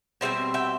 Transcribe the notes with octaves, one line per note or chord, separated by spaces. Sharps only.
B2 G3 C4 C5 E5
E5 G5